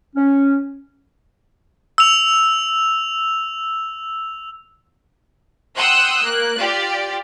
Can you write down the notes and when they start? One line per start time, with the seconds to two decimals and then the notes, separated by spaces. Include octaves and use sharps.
0.16 C#4
1.98 E6 F7
5.77 F#5 G5 C6 D#6 E6 F#6
6.23 A#3 F#6
6.59 F4 G4 D5